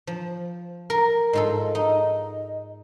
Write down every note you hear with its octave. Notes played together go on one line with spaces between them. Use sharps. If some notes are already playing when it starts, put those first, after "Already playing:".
F3
A#4
G#2 F4 A4 D#5
D#4 D#5